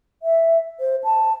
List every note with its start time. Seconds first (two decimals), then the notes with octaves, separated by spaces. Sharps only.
0.22 E5
0.80 C5
1.04 A5